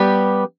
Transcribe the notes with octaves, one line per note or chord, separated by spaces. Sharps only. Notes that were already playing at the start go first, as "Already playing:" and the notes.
Already playing: G3 B3 G4